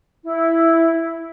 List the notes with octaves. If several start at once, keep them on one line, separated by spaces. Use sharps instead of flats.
E4